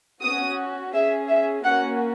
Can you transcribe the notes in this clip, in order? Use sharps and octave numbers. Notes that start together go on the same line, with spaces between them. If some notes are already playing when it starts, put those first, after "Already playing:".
C#4 F#4 D#6
C#4 G#4 E5
E5
A#3 C#4 F#4 F#5